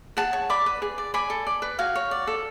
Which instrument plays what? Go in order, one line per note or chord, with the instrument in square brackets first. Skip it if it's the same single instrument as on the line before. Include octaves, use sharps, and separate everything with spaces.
[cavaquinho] G#4 F#5 A5
C#5
D5 B5 D6
B4
G#4
D5
D5 G#5 B5
A4
D5
B4
F#4 F5 G#5
C#5
D5
A4